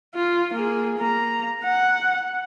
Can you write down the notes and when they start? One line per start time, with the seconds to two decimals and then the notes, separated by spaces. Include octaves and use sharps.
0.15 F4
0.54 A#3 G#4
0.98 A#3 A#5
1.64 F#5